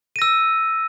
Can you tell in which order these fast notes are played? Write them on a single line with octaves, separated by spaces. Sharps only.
D#7 A#6 E6